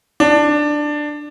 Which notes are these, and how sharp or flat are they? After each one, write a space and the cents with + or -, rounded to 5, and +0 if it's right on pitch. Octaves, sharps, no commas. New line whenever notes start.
D4 +10